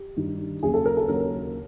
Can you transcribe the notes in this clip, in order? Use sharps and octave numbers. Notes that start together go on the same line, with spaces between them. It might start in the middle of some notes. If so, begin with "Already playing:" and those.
Already playing: G4
G2 D#3 G3
D#2 C#3 F#3 G#4
A4
A#4
A4
D#2 C#3 F#3 A#4